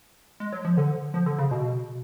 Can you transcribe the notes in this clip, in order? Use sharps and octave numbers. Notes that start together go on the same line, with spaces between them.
G#3
F#3
F3
D3
F3
D3
C#3
B2